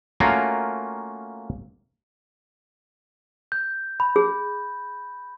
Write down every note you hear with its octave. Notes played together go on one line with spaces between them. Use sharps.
A3 A#3 C#4 F4 F#4 A#4
G6
B5
G#4